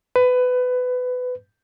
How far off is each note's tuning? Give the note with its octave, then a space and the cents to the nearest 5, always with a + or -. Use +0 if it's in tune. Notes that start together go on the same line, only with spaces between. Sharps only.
B4 +20